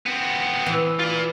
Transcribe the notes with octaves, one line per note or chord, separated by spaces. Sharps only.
B3 C4
E3
F4 D5